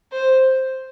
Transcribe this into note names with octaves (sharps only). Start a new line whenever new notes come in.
C5